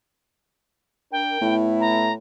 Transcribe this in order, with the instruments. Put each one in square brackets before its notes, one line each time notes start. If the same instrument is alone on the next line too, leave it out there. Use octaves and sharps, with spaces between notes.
[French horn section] D4 A#4 [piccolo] G5
[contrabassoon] A2 [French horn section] A3 B3 E4
[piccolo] A#5